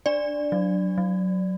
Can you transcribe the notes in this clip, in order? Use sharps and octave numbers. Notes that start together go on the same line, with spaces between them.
D4 D5
F#3
F#3